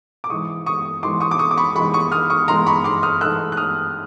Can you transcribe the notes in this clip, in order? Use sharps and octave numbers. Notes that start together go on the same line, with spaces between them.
D6
G#2 E3 G#3 C#6 D#6
C#6 D#6
G#2 E3 G#3 C6 D6
C#6 D#6
D6
C#6 D#6
D6
B5 C#6
G#2 E3 G#3 B5 C#6
C#6 D#6
D#6 F6
C#6 D#6
G#2 E3 G#3 A#5 C6
B5 C#6
C6 D6
D#6 F6
G#2 E3 A3 E6 F#6
F#6
D#6 F6